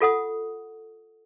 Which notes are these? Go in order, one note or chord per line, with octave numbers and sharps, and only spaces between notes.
F4 A4 F#5 D#6